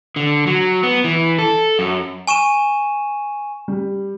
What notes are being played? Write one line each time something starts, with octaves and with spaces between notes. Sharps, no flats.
D3
F#3
B3
E3
A4
F#2
G#5 C#6 D#7 E7
G3